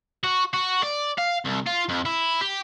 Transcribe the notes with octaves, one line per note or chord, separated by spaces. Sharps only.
F#4
F#4
D5
F5
C2
F4
F2
E4
G4